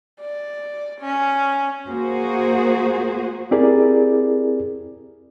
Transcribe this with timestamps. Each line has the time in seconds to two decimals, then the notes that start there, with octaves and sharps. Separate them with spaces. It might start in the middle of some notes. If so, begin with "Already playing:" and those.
0.21 D5
1.01 C#4
1.90 A#3 F#4 G#4 C5
3.51 C4 E4 G4 G#4 A#4 D5